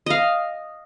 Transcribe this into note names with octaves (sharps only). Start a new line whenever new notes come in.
D#5 F5